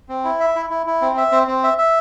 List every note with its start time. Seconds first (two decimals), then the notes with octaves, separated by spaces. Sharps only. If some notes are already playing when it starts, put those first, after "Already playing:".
0.09 C4
0.24 E4
0.40 E5
0.56 E4
0.70 E4
0.86 E4
1.02 C4
1.17 E5
1.32 C4
1.47 C4
1.63 E5
1.78 E5